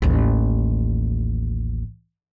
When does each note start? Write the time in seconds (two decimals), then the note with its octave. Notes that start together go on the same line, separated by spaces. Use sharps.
0.02 A1 D#2